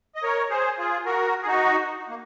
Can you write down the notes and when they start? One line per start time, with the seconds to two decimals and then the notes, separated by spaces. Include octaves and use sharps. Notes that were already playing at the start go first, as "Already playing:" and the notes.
0.15 D#5
0.23 A#4 C#5
0.50 G#4 C5
0.78 F4 G#4
1.05 F#4 A#4
1.43 G#4
1.47 D#4 F#4
2.09 A#3